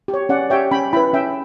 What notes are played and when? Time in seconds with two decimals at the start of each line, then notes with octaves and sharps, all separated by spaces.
0.08 G4
0.14 C#5
0.29 C#4 D5 F#5
0.50 G4 C#5 E5 G5
0.71 C#4 G5 B5
0.93 E4 B4 G5 B5
1.13 C#4 E5 G5